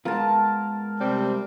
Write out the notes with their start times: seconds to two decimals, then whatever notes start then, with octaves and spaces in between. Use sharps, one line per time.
0.05 G#3 B3 F4 A#4 A5
0.99 C3 G3 C4